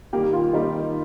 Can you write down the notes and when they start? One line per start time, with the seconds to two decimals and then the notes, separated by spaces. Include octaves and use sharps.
0.13 D#3 G3 A#3 G4
0.33 F4
0.53 D#3 G3 A#3 D#4